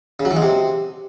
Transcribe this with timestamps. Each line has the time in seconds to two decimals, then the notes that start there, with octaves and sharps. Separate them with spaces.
0.20 C#3
0.25 F#3
0.31 E3
0.36 G#3
0.42 C3